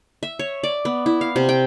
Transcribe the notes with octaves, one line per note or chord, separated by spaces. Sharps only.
E5
C#5
D5
B3
E4
F5
C3
G5